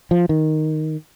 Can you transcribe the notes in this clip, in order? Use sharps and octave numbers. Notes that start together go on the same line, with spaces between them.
F3
D#3